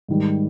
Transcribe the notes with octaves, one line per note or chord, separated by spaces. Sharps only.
G#2 D#3 G3